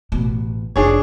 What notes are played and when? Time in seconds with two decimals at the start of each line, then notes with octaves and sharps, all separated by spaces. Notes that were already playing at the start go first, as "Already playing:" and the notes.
0.12 A1 B2
0.76 F1 D4 G#4 C#5